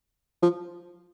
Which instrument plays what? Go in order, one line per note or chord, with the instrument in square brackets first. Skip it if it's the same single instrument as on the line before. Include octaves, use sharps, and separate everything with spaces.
[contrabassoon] F3